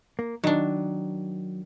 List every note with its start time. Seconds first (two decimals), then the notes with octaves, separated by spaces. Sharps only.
0.19 A#3
0.44 D#3 F#3 D4